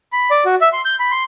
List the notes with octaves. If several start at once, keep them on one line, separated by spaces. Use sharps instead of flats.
B5
D5
F#4
E5
C6
G6
B5
C6